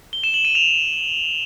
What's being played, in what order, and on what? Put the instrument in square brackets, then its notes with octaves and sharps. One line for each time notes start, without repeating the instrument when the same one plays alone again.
[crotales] G7
E7
F#7
D#7
F7